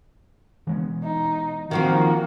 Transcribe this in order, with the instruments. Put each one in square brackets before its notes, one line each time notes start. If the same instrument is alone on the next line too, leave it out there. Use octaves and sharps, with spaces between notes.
[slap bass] E3 G#3 B3
[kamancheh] D#4
[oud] D#3 F3 C4 [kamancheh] A#3 F#4